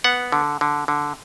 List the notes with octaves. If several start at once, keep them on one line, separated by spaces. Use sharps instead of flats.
B3 F#5
D3
D3
D3